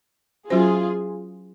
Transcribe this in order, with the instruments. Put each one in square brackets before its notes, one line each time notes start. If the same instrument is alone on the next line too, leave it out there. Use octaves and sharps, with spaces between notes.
[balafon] F#3 C#4 F#4 C5 [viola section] F4 G#4